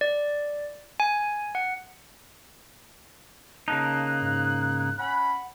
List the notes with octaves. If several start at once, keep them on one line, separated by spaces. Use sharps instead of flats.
D5
G#5
F#5
C#3 A#3 D#4 A5 F#6
G#2
C#4 F#5 B5